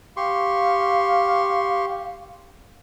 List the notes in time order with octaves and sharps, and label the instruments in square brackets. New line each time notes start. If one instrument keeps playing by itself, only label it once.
[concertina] G4 C6 C#6 [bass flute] F5